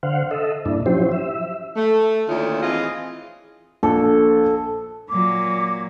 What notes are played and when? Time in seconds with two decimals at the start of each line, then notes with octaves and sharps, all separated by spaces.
0.03 D3 C5 F5 F#5
0.31 A4 D#5 E5
0.65 G2 A#2 D4 E4
0.86 F3 F#3 C#4 E4 G4 C5
1.12 E5
1.76 A3
2.28 D2 A#2 D#3 C#4 E4 F4
2.63 E3 C4 F4 G#4 D#5
3.83 A#1 A4
5.10 A#2 F#3 D6